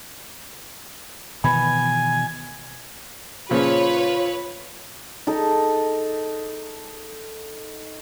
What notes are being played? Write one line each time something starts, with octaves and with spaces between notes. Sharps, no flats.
B2 D#3 E3 G#5 B5
A#2 C#3 F3 F4 B4 C#5
D#4 A4